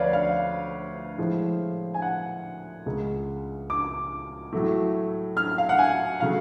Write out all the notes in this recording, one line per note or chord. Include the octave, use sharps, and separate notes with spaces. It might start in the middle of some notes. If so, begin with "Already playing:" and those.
Already playing: D2 D3 F3 B4 C#5 D5 F5
F5
A2 F3 G#3
G#5
F#5
C#2 C#3 G#3
D6
A2 F#3 A3
F6
F5
F#5
G#5
C#3 F#3 A3 F5